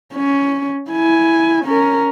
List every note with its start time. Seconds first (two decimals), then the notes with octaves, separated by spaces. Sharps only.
0.14 C#4
0.90 E4 G#5
1.65 C#4 A#4